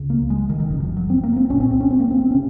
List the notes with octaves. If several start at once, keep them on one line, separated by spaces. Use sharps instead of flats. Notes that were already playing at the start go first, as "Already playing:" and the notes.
Already playing: C#2 C#3
A#3
G#3
D#3
D#3
F#1 F2 C#3
F3
F#3
C4
A#3
C4
C2 A#2 C#4
C4
C4
C#4
C4
A#3
C4
C4
C3 C#4